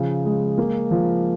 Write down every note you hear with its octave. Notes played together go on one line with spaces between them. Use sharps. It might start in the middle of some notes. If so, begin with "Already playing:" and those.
Already playing: C#3 F3
G#3
A#3
F3